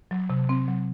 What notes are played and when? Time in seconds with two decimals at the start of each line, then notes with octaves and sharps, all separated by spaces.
0.11 F#3
0.30 C3
0.49 C4
0.68 F#3